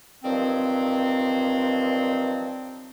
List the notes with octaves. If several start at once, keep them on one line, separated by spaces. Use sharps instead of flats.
G2 D#3 F3 F#3 C4